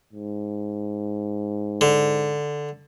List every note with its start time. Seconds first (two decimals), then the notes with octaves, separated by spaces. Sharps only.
0.13 G#2
1.81 D3